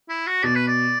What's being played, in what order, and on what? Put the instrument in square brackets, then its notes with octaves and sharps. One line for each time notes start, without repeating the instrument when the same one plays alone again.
[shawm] E4
F#4
[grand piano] B2 [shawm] D5
[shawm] B4
D5